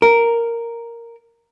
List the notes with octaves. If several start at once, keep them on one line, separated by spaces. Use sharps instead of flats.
A#4